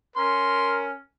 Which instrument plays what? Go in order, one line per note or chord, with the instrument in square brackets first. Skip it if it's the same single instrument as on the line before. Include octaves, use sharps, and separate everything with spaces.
[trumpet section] C#4 A#4 [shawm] C6